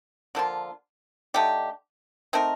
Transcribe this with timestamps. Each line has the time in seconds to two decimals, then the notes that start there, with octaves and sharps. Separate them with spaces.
0.35 D3 F3 A#3 F4
1.34 D3 A3 D#4 G4
2.33 A3 C4 D#4 A#4